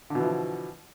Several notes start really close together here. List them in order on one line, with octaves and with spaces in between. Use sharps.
D3 B2 E3 F3